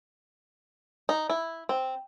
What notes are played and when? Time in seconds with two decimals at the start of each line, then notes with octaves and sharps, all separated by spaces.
1.09 D#4
1.30 E4
1.69 C4